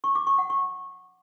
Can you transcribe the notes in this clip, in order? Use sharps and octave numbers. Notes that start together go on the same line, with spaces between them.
C#6
D6
C#6
F#5
C#6